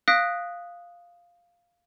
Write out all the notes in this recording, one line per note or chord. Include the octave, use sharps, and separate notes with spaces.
F5 D#6 F#6 A#6 B6 D7